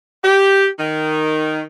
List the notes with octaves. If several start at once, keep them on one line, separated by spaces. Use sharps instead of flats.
G4
D#3